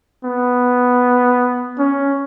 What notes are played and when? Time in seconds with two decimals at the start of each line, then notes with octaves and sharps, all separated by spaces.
0.24 B3
1.79 C#4